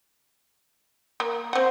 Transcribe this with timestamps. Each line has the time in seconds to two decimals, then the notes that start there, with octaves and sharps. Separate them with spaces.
1.20 A#3
1.53 C4 C5 F#5